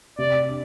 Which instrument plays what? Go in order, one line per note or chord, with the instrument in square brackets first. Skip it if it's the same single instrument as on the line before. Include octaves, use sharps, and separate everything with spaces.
[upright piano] C3 [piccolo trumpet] D5
[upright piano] D4